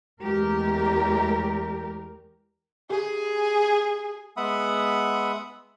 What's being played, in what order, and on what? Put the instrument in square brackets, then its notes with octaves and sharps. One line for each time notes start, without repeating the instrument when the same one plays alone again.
[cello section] E2 G#3 A3 G4 A#4
[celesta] G4 [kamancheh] G#4
[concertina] G#3 B3 E5 F#5 B5 D#6